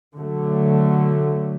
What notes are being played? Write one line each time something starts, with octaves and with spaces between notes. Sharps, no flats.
D3 F#3 A3